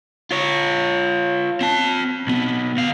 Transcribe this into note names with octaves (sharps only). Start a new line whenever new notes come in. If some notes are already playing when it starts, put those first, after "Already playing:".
F4 C#5
C4 A5
B1 B3
D2 F5